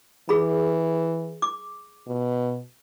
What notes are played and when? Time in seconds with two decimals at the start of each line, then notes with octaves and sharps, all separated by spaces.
0.29 E3 G#4 B5
1.42 D6
2.07 B2